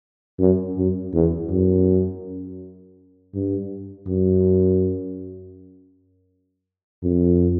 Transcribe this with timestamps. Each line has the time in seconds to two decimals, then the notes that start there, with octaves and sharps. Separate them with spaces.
0.39 F#2
0.77 F#2
1.14 E2
1.51 F#2
3.34 G2
4.07 F#2
7.03 F2